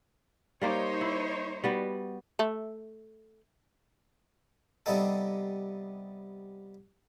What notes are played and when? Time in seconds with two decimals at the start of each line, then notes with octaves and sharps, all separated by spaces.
0.61 G3 A#3 D#4 G4 C5 C#5
1.01 E4
1.64 G3 B3 F#4
2.39 A3
4.86 C3 G3 B3 D#4 A4